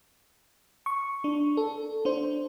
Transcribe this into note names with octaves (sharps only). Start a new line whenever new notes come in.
C#6
D4
A4
D4 C5